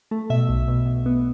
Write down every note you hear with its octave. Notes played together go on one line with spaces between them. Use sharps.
A3
B2 E5
B1
B2
B2
B3